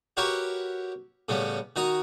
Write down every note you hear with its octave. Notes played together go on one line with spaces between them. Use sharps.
F#4 G4 A#4 B4 C#5 E5
A2 C#3 G3 B3
D#3 F#4 D#5 A#5 D#6